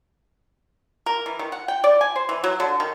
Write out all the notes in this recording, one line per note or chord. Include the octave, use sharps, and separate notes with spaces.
A#4
E3
D#3
F#5
G5
D5
G#5
C5
E3
F#3
D3
D#3